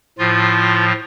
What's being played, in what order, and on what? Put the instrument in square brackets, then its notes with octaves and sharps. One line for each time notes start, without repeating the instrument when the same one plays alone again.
[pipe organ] A2 F3 F4